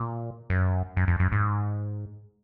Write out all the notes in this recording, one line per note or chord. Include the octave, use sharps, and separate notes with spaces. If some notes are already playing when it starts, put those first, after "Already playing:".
Already playing: A#2
F#2
F#2
F2
F#2
G#2